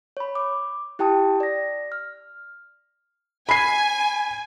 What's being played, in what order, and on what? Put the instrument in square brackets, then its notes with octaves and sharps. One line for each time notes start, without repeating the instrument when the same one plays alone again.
[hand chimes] C#5 B5
D6
E4 G4 G5 A5 D#6
D5 A#6
F6
[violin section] G#5 [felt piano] B5 C7